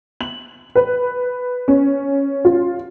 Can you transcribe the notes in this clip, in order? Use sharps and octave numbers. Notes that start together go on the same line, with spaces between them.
F#7
B4
C#4
F4